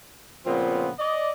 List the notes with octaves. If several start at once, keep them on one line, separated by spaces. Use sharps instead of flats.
A#2 C#3 F3 B3 C4
D5 D#5